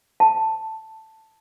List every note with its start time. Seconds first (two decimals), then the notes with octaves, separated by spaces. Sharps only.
0.20 A5